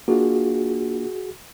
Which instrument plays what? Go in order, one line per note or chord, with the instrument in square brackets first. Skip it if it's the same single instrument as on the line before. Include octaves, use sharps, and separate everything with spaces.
[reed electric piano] A#3 D4 F4 [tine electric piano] F#4 G#4